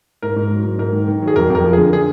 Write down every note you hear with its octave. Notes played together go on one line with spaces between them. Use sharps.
G#2 A#4
G#2
F#3
G#2
G#2 A#4
D#3
D#3
F#3
G#4
F2 A#4
F2 A#4
F3
D3 G#4
D3 G#4